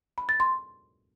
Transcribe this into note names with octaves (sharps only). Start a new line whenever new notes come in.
B5
A6
C6